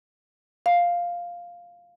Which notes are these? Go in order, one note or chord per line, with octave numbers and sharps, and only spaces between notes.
F5